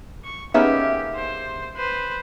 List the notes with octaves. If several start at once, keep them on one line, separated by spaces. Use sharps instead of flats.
C#6
A#3 B3 C#4 D#4 G4 G#4 E5
C5
B4 C5